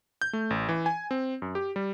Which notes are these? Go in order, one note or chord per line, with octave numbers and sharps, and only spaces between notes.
G6
A3
A1
E3
G#5
C4
F#2
G4
G3